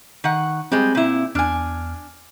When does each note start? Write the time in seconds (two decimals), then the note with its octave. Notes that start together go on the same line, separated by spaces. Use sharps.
0.24 D#3 F#5
0.72 G3 G#3 C4
0.95 A#2 E4
1.35 E2 D4 G#5 F6